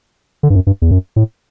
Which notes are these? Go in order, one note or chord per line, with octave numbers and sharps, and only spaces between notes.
D3
G2
F#2
G2
E2
F#2
A2